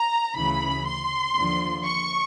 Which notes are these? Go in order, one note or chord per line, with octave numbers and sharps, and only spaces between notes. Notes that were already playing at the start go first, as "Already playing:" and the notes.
Already playing: A#5
D2 C#3 E3 B5
C6
D#2 D3 F3
C#6